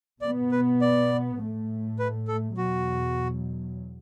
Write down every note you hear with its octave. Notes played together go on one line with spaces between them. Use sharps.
B2 B3 D5
B4
D5
A2 A3
B4
A4
E2 B2 F#3 F#4